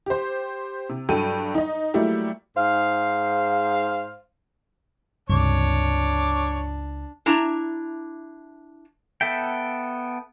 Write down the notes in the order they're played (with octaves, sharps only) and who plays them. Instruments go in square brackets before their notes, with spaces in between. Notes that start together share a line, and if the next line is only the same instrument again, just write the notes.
[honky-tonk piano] G4 C5
C3
G2 F#3 A4 G5 D#7
D#4 D#5
F#3 G3 A3 A#3 E4 G4
[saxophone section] G#2 C5 F5
[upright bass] C#2 [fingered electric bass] G2 C3 [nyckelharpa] D4 [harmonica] C#5 D6
[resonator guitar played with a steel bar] D4 E4 A#5
[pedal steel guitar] B3 A4 E5 G5